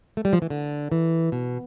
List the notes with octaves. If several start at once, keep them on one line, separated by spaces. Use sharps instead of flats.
A3
G3
F3
E3
D3
E3
B2